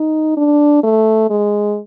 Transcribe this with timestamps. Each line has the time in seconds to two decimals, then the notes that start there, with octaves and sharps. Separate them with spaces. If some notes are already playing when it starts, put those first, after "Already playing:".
Already playing: D#4
0.37 D4
0.83 A3
1.30 G#3